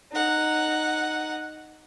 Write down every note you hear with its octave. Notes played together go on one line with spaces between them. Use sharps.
D#4 F#5